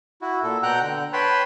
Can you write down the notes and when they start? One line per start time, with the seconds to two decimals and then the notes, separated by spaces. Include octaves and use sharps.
0.21 E4 F#4
0.43 A#2 A4
0.63 B2 F#5 G5 A#5 F#6 G6
0.82 D3
1.13 B4 C#5 G5 A5 B5 C6